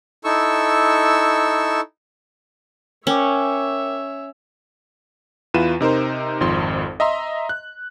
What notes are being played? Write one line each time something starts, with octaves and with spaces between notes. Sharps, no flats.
D#4 E4 A4 C#6 E6
C#4 A#4 C#5 E5 G5 D6
E2 E4 F4 B4 D#7 E7
C3 D#4 A#4 C5
G#1 F2 C6
D#5 E5 A#5 C6
F#6